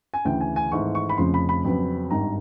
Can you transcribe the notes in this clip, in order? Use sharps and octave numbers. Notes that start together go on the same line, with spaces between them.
G#5
D2 C#3 E3 G5
G#5
G#5
G#1 G#2 E3 A3 C#6
C#6
B5
F1 F2 C#3 F3 C6
B5
B5
F2 C#3 F#3 B3
G#1 G2 D#3 A#5